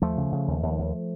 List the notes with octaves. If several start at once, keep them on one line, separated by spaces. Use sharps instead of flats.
D#2 F3 A3
C#3
C#3
D#2
D#2
D#2